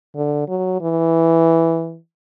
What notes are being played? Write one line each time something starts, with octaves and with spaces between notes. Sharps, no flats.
D3
F#3
E3